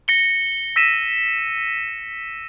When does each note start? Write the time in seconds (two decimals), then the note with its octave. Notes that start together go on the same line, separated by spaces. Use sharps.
0.08 A#6 C#7 G7
0.76 E6 A#6 B6 D#7 E7